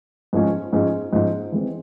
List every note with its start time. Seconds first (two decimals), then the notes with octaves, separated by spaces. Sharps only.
0.33 G#2 F3 G#3 C#4
0.73 G#2 F3 G#3 C#4
1.13 G#2 F3 G#3 C#4
1.52 E3 G#3 C4